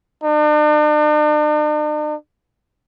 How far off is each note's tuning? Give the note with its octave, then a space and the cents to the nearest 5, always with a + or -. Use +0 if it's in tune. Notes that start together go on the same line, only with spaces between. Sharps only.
D4 +45